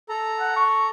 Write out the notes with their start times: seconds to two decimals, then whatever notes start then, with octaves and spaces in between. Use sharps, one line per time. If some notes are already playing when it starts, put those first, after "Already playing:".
0.09 A4 A#5
0.40 F#5
0.56 C#6